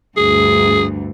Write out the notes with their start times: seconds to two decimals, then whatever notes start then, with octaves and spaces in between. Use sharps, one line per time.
0.17 D2 G2 G#4